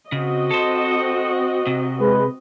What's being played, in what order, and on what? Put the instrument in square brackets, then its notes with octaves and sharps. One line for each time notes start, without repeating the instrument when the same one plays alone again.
[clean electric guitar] C#3 [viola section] C4 F#4 D#5
[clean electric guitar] A4 C5
C3
[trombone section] G#3 B4